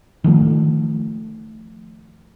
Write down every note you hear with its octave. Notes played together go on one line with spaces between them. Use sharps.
D#3 F3 A3